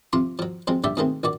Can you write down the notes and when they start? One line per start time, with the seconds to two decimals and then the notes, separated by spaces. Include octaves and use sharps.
0.13 C3 F3 F4 C6
0.39 F3 F#3
0.67 F3 F#3 G#3 C4
0.84 A#1 D3 G3 D5 E5 G5
0.97 B2 D#3 G#3 A3 C4
1.23 A#1 A#2 F#4 D5